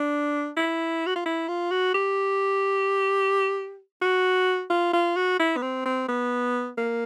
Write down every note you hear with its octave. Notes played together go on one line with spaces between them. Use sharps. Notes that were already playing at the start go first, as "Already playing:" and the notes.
Already playing: D4
E4
F#4
F4
E4
F4
F#4
G4
F#4
F4
F4
F#4
E4
B3
C4
C4
B3
A#3